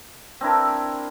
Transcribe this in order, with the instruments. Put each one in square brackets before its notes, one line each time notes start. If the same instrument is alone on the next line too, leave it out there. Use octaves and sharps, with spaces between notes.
[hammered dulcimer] C4 D4 E4 A#4